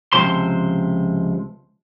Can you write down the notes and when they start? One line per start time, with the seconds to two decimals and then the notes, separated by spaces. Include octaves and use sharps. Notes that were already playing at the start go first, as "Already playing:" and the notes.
0.13 C#2 F#2 C3 F3 C5 C6